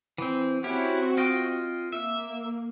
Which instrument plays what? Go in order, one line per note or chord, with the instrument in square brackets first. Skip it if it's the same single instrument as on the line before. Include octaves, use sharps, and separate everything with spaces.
[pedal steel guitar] E3 C4
[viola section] C4 F#4 [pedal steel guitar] C#4 E4 G4
[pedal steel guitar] F4 D#5 G5
[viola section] A#3 [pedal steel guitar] E5